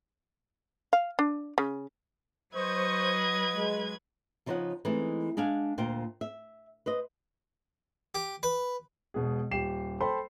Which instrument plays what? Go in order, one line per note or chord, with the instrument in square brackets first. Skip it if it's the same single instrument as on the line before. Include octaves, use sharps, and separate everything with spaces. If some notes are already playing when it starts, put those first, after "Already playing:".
[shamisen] F5
D4
C#3
[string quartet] F#3 B4 G#6 [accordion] C5 C#6 [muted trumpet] D#5
[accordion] G#3
[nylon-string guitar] C#3 F3 D#4 C5 C#5 F#5
E3 G#3 A3 B3 C4 D#4
G#3 D4 F5 F#5 G#5
D2 A#2 F4 C5 G5
E5
B4 C5 D#5
[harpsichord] G4
B4
[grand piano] E1 B2 G#4
D#1 G4 C7 E7
A4 C5 G5 B5 C6